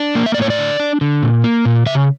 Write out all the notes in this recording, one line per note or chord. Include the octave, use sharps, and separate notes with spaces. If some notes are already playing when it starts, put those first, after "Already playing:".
Already playing: D4
A#3
E5
D5
A2 C#5
D5
D3
D4
D3
A#2
A#3
A#2
C#3 E5